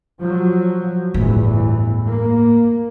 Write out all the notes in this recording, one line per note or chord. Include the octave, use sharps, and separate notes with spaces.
F3 F#3
G1 E2 A2 E3
A#3